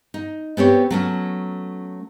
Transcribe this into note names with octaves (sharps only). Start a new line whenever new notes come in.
D#4
B3 C4 G4 C#5
F#3 A3 C#4